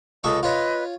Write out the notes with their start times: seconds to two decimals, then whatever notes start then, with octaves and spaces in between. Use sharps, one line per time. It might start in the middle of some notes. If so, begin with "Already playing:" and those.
0.24 C#2 A4 D#5 C#6 D#6
0.43 F4 B4 C#5 D#5